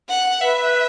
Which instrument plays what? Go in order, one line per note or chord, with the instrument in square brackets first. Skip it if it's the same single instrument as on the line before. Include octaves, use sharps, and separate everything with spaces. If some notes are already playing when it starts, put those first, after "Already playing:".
[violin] F#5
[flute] B4 [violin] E5